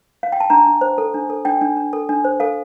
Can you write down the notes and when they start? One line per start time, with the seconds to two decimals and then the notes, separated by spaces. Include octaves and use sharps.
0.23 F5
0.32 G5
0.40 A5
0.50 D4 A#5
0.66 D4
0.81 C5
0.98 A4
1.14 D4
1.30 A4
1.45 D4 G5
1.61 D4
1.77 D4
1.93 A4
2.09 D4
2.25 C5
2.40 A4 F5